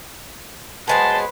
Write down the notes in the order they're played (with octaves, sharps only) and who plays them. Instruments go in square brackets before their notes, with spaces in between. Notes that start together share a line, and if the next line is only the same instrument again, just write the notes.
[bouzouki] F#3 G#3 B3 [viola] B4 C5 [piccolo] A5